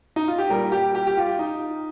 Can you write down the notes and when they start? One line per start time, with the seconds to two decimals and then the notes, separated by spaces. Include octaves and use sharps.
0.16 D#4
0.28 F4
0.38 G4
0.49 A#2 G3 A#4
0.72 G4
0.95 G4
1.07 G4
1.17 F4
1.39 D#4